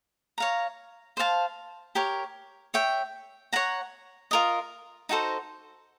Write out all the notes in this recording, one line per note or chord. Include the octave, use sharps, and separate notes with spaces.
C#5 F5 A#5
C5 F5 A5
G4 A#4 C#5
C#5 E5 G5
C#5 F#5 A#5
F4 A#4 D#5
D#4 F#4 A4 C5